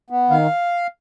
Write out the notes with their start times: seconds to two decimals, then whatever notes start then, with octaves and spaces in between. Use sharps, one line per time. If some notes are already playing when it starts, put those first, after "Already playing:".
0.10 B3
0.30 D#3 F5